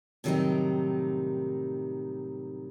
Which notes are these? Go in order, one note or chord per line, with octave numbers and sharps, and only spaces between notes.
A2 C3 D#3 F#3 G3 D#4